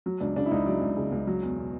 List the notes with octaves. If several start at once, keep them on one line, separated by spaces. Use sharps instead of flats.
F#3
C#2 D4
C#3 D4
E4
C#2 D#4
F#3 D4
C#2
C#3
C#2
F#3
E2
B2